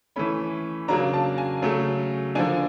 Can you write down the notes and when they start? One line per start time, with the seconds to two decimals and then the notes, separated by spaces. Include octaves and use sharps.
0.16 E3 A3 C#4 B5
0.88 C#3 F#3 A#3 D4 A#5
1.14 A5
1.38 G#5
1.62 C#3 F#3 A3
2.35 D3 F3 A#3 D4 G#5